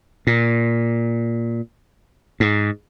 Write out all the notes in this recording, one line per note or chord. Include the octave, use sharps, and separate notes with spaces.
A#2
G#2